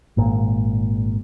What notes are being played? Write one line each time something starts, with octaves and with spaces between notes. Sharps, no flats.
G#1 A#2